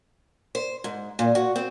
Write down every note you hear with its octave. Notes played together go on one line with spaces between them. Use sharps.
C5
G#2
A#2
F#4
C4